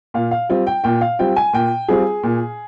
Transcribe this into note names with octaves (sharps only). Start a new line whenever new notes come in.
A#2 F5
F5
G3 C4 F4
G5
A#2 G5
F5
G3 C4 F4 G5
G#5
A#2 G5
G3 C4 F4 G#4
A#2